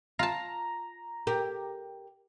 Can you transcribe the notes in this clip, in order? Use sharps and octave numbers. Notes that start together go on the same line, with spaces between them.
F4 A5 A#5
G4 A#4